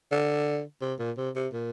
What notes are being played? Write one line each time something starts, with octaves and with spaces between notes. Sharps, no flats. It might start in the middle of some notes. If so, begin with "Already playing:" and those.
D3
C3
A#2
C3
C3
A#2